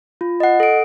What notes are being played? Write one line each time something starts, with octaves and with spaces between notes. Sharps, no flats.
F4
D#5 F#5
A4 D7